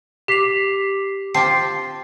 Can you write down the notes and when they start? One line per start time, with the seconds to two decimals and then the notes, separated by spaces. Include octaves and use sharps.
0.28 G4 D6 B6 C7 F7
1.35 C4 F4 G4 A5 C7